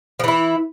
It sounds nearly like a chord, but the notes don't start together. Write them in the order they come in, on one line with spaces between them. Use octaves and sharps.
F3 E3 E4